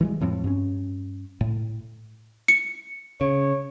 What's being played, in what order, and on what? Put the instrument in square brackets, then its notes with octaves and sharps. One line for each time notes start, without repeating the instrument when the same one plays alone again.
[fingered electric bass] E3 G3 G#3
F2 A2 F3 C4
G2 C#4
A2
[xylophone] C#7
[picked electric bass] C#3 [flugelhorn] C#5